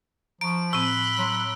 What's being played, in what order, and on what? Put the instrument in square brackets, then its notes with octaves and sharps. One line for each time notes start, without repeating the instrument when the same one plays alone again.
[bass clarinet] F3 [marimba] A#5 C#6 [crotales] D7
[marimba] A2 C4 A#5 [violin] B5 F#6 [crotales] E6
[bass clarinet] F#3 [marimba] C6